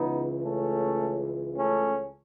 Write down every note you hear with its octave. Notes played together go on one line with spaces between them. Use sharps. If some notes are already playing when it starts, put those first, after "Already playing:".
Already playing: C#2 C#3 E3 B3 D#4
A3 C#4
A3 C#4